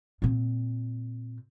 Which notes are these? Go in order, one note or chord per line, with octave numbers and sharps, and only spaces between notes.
A#2 C4